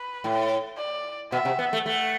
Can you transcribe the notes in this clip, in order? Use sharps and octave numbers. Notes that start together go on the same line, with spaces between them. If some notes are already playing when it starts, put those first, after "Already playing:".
Already playing: B4
A2
D5
B2 E5
C3
B3
A3
A3 F#5